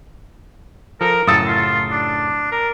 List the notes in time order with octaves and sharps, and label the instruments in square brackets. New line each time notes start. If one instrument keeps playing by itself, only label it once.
[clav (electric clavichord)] F3 A4 [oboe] A#4
[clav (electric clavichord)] F#2 A2 C#3 [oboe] A4 [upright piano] D#6 E6 A6
[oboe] F4
D4
A#4